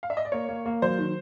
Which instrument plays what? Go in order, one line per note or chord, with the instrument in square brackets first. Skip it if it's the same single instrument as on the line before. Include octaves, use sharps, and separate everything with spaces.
[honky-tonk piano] F5
E5
D#5
D5
[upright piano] A#3 [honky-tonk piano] C#5
[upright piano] A#3
A#3
[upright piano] F#3 [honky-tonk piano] C5
[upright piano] D#3